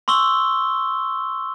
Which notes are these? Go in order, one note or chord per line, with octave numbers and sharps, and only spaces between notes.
C6 C#6 E6 G7